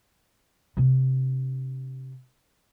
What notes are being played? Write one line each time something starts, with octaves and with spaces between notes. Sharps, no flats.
C3 D4